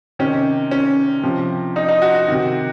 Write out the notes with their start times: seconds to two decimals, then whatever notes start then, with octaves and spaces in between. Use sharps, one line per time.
0.19 C3 D#3 C#4
0.71 C#4
1.23 C3 F3
1.76 D#4
1.89 D#4
2.02 F#4
2.15 F#4
2.28 C3 D#3